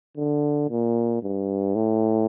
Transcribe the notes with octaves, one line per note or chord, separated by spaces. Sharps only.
D3
A#2
G2
A2